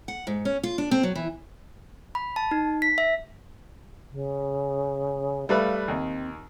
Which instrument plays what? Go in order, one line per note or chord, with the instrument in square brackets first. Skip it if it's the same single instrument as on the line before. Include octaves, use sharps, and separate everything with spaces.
[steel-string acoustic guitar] F#5
G#2
C#4
F4
D4
C4
F#3
E3
[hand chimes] B5
A5
D#4
B6
E5
[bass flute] C#3
[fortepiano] G3 A3 B4 [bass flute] F5
[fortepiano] D#2 [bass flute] C4